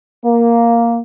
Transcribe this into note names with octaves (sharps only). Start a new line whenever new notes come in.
A#3